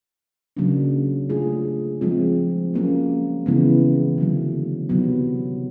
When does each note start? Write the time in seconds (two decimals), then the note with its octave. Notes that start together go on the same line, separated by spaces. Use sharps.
0.57 C#3 F#3 A#3 D4
1.30 A3 D4 F4 G#4
2.01 F3 G#3 C4 F4
2.74 F#3 A#3 C#4
3.46 C#3 E3 G#3 B3
4.18 D3 F#3 A#3
4.89 C3 D#3 F#3 B3